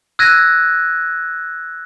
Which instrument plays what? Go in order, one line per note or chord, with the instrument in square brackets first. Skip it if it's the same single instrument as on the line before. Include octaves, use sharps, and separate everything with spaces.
[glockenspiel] E6 F#6 G#6 A#6 D#7